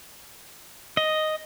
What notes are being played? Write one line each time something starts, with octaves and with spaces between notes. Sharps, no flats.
D#5